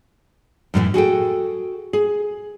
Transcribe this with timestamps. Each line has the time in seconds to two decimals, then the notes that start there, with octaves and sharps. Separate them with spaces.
0.74 F#2 A2 D#3 E3
0.94 F#4 G#4 A4 G5
1.93 G#4